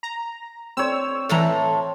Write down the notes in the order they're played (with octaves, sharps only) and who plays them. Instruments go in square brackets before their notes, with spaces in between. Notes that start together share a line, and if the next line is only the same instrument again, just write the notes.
[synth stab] A#5
[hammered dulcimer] C4 C#5 [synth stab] E6
[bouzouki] A2 A3 A#5 [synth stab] E3 A4